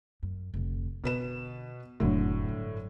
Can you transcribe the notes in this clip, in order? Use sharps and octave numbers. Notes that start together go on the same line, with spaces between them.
F#2
F1 D2
B2 D3 B4 E7
F1 F#2 A2 D3 F#3
G2